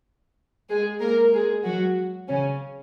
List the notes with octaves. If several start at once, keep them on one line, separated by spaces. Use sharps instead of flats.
G#3 G#4
A#3 A#4
G#3 G#4
F#3 F#4
C#3 C#4